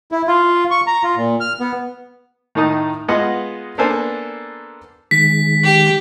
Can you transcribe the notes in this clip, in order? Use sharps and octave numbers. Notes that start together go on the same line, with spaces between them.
E4
F4
C#6
A#5
F4
A#2
F6
B3
A2 D#3 D#4 A5 D#6
G#3 B3 F4 D#5 F#5
A#3 B3 D4 A4 C5 G#5
D#3 G#3 B6
G4